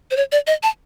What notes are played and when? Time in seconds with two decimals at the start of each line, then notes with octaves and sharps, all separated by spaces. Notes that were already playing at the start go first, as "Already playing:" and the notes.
0.11 C5
0.17 C#5
0.32 D5
0.47 D#5
0.63 A5